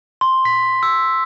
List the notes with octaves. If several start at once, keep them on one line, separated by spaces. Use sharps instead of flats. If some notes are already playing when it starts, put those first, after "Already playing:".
C6
B6
E6